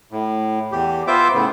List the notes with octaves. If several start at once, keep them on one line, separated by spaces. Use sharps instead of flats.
A2
E2 G4
B3 F4 C5 E5 D6 G6
A2 C#3 B3